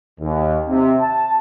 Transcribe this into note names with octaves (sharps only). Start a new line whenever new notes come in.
D#2
C3
A5